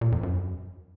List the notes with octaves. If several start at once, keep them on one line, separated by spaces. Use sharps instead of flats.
A#2
F2
F#2